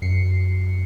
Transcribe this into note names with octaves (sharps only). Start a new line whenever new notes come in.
F#2 C7 C#7